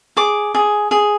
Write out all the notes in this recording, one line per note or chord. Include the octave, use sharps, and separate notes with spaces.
G#4 D6
G#4
G#4